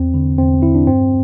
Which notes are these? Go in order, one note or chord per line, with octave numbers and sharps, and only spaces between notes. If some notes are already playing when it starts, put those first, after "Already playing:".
Already playing: E2 C4
D3
E2 C4
D3 E4
D4
G2 C4